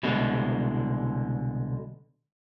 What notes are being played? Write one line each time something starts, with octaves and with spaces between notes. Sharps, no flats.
C2 B2 D3 G#3